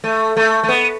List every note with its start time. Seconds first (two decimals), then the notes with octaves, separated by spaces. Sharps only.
0.04 A3
0.37 A3
0.64 A3
0.69 B3